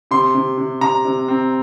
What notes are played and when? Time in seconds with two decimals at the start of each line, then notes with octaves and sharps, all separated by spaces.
0.11 C3 C6
0.35 C3
0.58 C3
0.81 C3 A#5
1.05 C3
1.28 C4